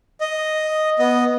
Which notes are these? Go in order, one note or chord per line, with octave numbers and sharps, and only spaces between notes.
D#5
B3 D#5